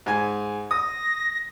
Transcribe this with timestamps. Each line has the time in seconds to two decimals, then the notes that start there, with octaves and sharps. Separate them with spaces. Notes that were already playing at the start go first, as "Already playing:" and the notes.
0.06 G#2 G#5
0.71 D#6 A#6